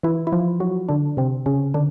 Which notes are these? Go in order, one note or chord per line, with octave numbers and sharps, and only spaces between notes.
E3 E4
E4
F3 F4
F#3 F#4
D3 D4
C3 C4
C#3 C#4
D3 D4